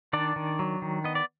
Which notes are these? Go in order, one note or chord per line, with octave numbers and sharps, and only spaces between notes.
D#3 D4 D5
D#3
F#3
D#3
B3 D#5
D5